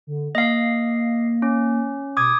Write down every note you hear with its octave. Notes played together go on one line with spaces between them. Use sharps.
D3
A#3 D#5 F5
C#4
B2 D6 D#6 G#6